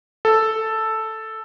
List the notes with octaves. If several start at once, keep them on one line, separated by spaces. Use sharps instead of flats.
A4